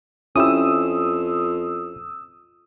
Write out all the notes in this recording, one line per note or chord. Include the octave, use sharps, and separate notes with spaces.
F2 C#4 E4 G4 D#6 E6